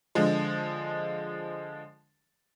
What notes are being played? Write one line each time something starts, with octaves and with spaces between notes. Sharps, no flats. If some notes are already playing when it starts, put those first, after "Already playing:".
D3 F3 G#3